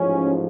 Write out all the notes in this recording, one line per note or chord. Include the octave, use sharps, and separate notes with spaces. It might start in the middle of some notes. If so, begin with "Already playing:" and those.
Already playing: A1 G#2 F3 C#4